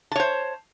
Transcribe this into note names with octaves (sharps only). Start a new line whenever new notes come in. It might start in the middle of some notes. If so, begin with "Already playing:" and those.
C5 C#5 A5